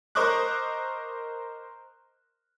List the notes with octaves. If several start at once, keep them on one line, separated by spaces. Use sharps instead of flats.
A#4 C5 D#5 C#6 D6 F#6